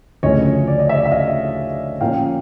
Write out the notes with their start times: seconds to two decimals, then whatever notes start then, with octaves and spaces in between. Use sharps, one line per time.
0.23 D2 C#3 F3 A3 C#4 C#5 D#5
0.68 D5
0.79 D#5
0.89 D5 E5
1.06 E5
1.11 D#5 F5
2.00 A#2 F3 A#3 C#4 F5 G5